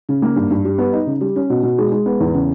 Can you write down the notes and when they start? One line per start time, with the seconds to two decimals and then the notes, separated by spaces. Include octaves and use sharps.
0.09 C#3
0.22 A#3
0.36 G2
0.50 G2
0.65 G3
0.78 B3
0.93 D#4
1.07 C#3
1.21 G3
1.36 C#4
1.50 B2
1.63 B2
1.78 G#3
1.92 G#3
2.06 B3
2.20 E2
2.34 C#3